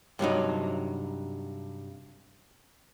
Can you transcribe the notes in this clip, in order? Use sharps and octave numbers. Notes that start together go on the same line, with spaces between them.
G2 C3 F#3 D#4